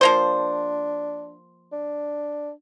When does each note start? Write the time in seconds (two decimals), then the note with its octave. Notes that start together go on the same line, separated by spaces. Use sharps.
0.01 F3 A#3 D4 C5
1.72 D4